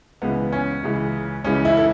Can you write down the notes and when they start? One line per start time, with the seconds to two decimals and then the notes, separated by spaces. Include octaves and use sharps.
0.22 C#2 C#3 E3 B3
0.53 C#4
0.84 C#2 C#3 E3
1.44 C#2 C#3 E3 C#4
1.65 E4
1.77 A4